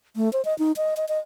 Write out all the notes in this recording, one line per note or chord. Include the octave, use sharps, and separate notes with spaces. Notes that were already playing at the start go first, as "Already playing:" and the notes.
A3
C5
D#5
D#4
D#5
D#5
D#5